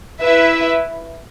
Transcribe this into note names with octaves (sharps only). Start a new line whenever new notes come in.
E4 B4 E5